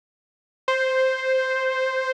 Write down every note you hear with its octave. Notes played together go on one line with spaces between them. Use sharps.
C5